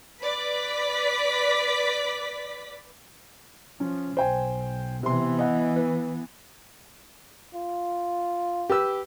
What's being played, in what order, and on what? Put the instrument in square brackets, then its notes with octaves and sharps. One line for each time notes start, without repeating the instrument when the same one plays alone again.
[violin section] B4 D5 B6
[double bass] F3 [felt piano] C#4
[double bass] B1 [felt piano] C5 G5 G#5
[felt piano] C3 C6 [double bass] E3 B3
[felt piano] D#5 F#5
B4
[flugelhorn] F4
[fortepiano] G4 B4 E6